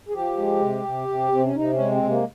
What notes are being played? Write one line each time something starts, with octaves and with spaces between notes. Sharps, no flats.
G#4
F3 G4
G#3
C3
C3
C3
C3 C4
C#4
C3 D#4
C#4
G#3
C4
C3
A#3